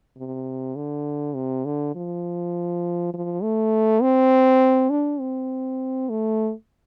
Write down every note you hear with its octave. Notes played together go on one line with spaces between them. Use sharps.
C3
D3
C3
D3
F3
F3
A3
C4
D4
C4
A3